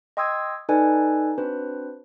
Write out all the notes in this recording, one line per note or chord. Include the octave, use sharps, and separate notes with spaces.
D#5 G5 C6 D#6 E6 G#6
D#4 A4 B4 D5 D#5 G#5
C4 D4 F#4 B4 C5